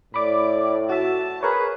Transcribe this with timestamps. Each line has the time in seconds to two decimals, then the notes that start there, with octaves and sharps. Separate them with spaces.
0.14 A2 D5 B5 D6
0.89 F#4 E5 A5
1.43 G#4 A#4 B4 C#5